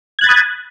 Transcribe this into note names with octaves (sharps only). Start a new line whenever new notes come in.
B5 D#6 F#6 G#6 A6